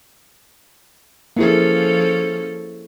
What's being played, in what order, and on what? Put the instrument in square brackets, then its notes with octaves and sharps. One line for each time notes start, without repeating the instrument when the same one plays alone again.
[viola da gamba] F3 C#4 A4 [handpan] A#3 E4 G#4